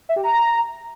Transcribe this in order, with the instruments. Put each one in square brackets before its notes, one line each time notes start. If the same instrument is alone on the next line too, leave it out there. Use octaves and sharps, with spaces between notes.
[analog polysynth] E5
G4
A#5